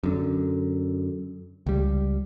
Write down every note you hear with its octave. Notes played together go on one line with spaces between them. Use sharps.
F#2 D3
C#2 G3